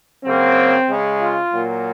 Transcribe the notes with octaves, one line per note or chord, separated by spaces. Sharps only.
C#3 F#3 A#3 C4
C#3 G#3
F4
A#2 F#3 A#3